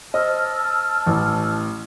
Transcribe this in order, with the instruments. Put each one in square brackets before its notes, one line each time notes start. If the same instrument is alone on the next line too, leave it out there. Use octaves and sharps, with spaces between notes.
[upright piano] C5 D#5 [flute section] A5 E6 F6
[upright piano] A1